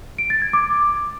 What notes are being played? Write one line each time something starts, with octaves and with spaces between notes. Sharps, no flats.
D7
A6
G#6
D6